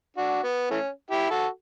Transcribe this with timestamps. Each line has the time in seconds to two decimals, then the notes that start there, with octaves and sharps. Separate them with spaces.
0.17 D4 F#4
0.43 B3
0.71 E3 A3 C#4
1.11 E4 G4
1.31 F#4 A4